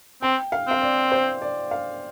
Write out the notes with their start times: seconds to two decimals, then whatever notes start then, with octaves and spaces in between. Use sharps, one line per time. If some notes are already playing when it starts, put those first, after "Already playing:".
0.22 C4 G5
0.52 F5
0.67 C4 F5
0.82 D5
1.12 C5
1.42 D5
1.71 F5